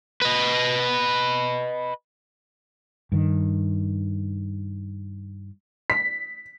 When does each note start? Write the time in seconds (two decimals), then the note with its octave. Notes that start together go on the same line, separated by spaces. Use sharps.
0.22 B4 D#5
3.12 G2 D#3
5.90 B6